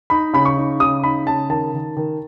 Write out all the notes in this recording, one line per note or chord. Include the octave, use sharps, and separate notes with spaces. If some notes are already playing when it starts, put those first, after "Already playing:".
D#4 B5
C#3 B5
C#6
D#4
C#3 D#6
D#4 B5
C#3 A5
D#3 A5
D#3
D#3